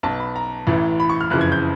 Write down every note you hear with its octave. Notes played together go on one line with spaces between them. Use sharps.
B1 B2 A5
B5
A#5
A1 A2 E3
B5
C#6
F6
F#1 F2 C#3 E3 F#6
G#6
G6